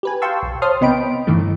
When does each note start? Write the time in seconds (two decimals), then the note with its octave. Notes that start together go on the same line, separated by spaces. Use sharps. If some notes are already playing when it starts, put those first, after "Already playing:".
0.03 G4 B4 G#5
0.22 F5 G5 A5 C6 C#6 E6
0.43 B1
0.62 C5 C#5 A5 C6 D#6 F6
0.81 C3 B3 D#5 G5 B5 D7
1.27 G2 D#3 E3 A3